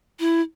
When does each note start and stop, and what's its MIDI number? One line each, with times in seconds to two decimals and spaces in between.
0.20 0.41 64